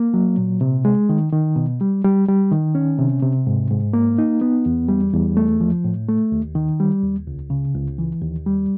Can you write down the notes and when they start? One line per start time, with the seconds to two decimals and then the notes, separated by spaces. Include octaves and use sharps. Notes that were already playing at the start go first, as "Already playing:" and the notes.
Already playing: A#3
0.14 F#3
0.37 A#2
0.61 C3
0.85 G#3
1.09 D#3
1.32 D#3
1.56 B2
1.81 G3
2.05 G3
2.28 G3
2.52 D#3
2.75 C#4
2.99 C3
3.22 C3
3.47 G#2
3.71 G#2
3.93 A#3
4.18 D#4
4.41 B3
4.66 E2
4.88 G3
5.13 E2
5.37 A3
5.61 F3
5.84 A2
6.08 A3
6.32 D#2
6.55 D#3
6.80 G3
7.02 D#2
7.27 C#2
7.50 C#3
7.75 C#2
7.98 E3
8.21 D#2
8.46 G3